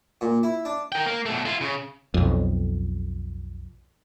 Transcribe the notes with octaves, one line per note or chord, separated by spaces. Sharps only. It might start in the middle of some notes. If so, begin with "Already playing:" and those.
A#2
E4
D4
A#4 G5
A#3
B2 A3
E4 F4
C#3
B1 F2